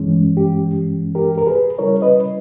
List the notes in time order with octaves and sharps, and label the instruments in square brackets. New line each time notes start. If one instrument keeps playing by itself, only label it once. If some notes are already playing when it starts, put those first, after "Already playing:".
Already playing: [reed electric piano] G2 E3 G#3 C#4
G4
G4 A#4
A#4
G#4 B4
C#3 G3 C#4 E4 A#4 C#5
B4 D#5